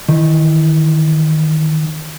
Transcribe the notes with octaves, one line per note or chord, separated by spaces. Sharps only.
D#3 E3